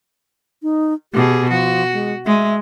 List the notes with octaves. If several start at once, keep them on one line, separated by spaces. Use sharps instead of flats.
D#4
B2 G4 G#4
F3 F#4
G#3
G#3 E5